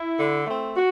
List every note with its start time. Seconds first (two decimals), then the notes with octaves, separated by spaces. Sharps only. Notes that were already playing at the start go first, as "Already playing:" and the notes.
Already playing: E4
0.19 D3
0.47 A3 C4
0.76 F#4